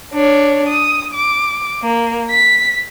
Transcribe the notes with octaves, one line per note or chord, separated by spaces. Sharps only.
D4 C#5
D#6
D6
A#3
B6